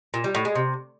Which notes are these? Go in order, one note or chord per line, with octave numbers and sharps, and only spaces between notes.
A#2
G3
A2
G#3
C3